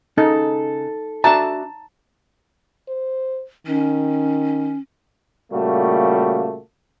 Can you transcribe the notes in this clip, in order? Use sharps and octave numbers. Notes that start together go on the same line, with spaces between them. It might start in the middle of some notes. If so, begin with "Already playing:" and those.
C#3 D#4 A4
D4 F#4 E5 A5 A#5
C5
D#3 C#4
A#2 C#3 G3 A3 A#3 F#4